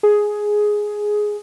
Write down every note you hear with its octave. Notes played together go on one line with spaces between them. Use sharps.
G#4